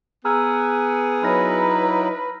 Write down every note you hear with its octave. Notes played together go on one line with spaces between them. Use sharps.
B3 G#4 A#5 E6 F6
F#3 D#4 E4 B4 B5 F6 A#6